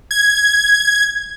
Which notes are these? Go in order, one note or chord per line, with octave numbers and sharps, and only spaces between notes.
G#6